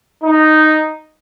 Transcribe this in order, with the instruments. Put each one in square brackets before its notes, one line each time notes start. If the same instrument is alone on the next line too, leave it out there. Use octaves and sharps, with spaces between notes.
[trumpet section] D#4